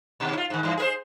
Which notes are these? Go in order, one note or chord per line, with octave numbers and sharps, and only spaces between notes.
D#2 B2
E4 F4
G#2 D#3
G2 E3
G#4 A#4 C5